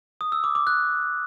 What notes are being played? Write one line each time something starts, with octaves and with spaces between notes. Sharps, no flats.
D#6
E6
D6
D6
F#6